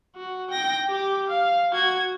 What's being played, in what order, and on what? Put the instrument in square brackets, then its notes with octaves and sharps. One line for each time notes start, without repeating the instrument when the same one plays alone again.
[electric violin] F#4
G5 A#6
G4 D6
F5
F#4 G#6